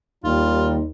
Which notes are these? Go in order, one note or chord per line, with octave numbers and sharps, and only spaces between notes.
D#2 G3 D#4 F4